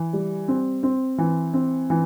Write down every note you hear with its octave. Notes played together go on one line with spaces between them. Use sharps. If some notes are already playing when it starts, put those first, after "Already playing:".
Already playing: E3
G3
C4
C4
E3
C4
E3